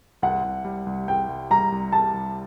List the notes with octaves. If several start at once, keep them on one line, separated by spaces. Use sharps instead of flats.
C2 F#5
C2
G3
C2
C2 G5
C2
G3 A#5
C2
C2 A5
C2